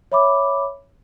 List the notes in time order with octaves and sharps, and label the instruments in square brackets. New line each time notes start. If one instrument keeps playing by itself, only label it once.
[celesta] C#5 E5 B5 D6